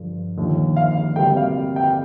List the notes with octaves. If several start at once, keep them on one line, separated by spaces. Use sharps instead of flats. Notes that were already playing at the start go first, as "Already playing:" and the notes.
Already playing: G2 D3 F3
D#2 D3 F3
F5
D2 C3 G3 A#3 G5
F5
G5